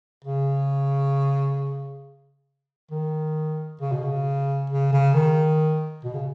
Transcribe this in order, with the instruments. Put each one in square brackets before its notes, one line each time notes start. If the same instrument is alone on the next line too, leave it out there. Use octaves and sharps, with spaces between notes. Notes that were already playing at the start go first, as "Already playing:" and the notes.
[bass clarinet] C#3
D#3
C#3
B2
C#3
C#3
C#3
D#3
B2
C#3